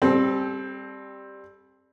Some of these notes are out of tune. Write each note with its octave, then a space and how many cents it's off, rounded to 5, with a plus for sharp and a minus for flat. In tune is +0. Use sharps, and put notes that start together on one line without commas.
G3 +10 C4 +15 A4 -30